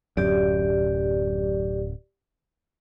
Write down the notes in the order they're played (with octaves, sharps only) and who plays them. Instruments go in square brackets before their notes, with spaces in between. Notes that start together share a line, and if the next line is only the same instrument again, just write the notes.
[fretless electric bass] D1 F#2 [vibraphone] G4 D5